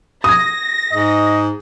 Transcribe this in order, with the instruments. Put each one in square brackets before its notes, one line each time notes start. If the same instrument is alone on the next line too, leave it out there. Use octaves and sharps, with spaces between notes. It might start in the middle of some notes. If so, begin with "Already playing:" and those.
[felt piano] D#6 G#6 [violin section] A#6
[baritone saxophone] G#2 [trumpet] D#5